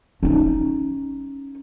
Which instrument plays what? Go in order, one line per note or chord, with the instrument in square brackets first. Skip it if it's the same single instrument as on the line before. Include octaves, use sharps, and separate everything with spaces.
[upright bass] C#4 D#4